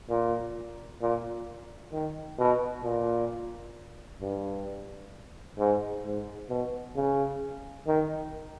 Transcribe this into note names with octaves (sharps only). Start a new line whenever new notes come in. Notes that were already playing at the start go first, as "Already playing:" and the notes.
A#2
A#2
D#3
B2
A#2
G2
G#2
G#2
B2
C#3
D#3